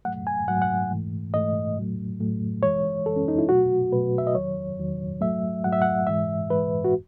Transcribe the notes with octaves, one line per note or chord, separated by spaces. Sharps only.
G#2 F#3 A3 F#5
G#5
G#2 F#3 A3 F#5
F#5
G#2 E3 A3
G#2 E3 A3 D#5
A2 F#3 A3
A2 F#3 A3
F#2 E3 G#3 C#5
F#2 E3 G#3 A4
C#4
D#4
E4
B2 F#3 A3 F#4
B2 F#3 A3 B4
E5
D#5
E2 D#3 F#3 C#5
E2 D#3 F#3
G#2 F#3 A3 E5
G#2 F#3 A3 F#5
E5
F#5
G#2 E3 G#3 E5
G#2 E3 G#3 B4
F#4